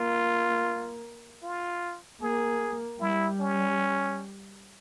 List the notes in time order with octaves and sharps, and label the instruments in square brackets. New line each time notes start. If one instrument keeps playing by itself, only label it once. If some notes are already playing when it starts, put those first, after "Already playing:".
Already playing: [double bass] A#3 [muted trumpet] F4
[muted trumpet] F4
[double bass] A#3 [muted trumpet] G#4
[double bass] G3 [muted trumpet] E4
[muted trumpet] C#4